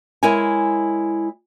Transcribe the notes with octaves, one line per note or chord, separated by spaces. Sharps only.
G#3 E4 A#4 C#5 G#5